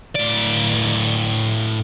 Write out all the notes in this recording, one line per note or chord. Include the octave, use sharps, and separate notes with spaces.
A2 D5